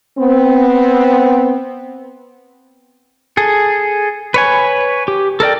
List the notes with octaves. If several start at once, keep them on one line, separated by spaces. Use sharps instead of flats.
B3 C4
G#4 A4
B4 C#5 G#5
G4
A4 A#4 D5 G5